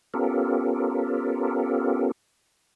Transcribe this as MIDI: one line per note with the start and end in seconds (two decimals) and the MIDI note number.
0.14 2.11 59
0.14 2.11 61
0.14 2.11 65
0.14 2.11 67
0.14 2.11 69
0.14 2.11 70